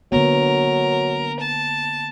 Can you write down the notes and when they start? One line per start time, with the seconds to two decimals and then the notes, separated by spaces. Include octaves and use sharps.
0.12 D3 F#3 A#3 B3 A#4
1.40 A5